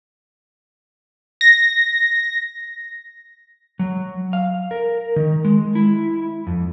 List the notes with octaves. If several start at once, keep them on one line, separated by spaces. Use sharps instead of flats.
A#6
F#3
F5
A#4
D#3
G#3
E4
F2